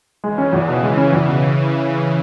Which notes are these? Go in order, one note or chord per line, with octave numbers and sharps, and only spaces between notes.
C#3 E3 G#3
C#4
E2
B2
C#3 G#3
C#4
E2
B2